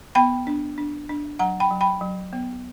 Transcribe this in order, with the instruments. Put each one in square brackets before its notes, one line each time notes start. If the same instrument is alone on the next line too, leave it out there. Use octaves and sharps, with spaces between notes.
[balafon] B3 G5 B5
D4
D4
D4
F#3 F#5 A#5
G5 B5
F#3
G5 B5
F#3
B3